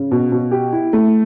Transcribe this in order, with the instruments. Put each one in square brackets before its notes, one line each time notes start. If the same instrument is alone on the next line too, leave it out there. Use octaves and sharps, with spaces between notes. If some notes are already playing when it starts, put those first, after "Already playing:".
Already playing: [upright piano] C#3
B2
B2
G4
E4
A3